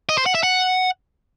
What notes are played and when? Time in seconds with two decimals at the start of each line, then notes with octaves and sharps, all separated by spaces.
0.09 D#5
0.18 C5
0.26 F#5
0.35 E5
0.43 F#5